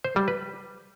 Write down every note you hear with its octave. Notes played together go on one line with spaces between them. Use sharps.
C5
G3
B4